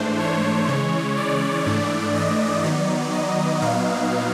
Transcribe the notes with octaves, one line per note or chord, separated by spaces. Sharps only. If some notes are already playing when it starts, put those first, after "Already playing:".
Already playing: G#2 E3 A3 D4 C5
C#5
C#3 E3 G#3 C#5
D5
G#2 E3 A3 D4
D#5
D#3 F#3 B3 D#4 D5
D#5
A#2 F#3 B3 D#4 F5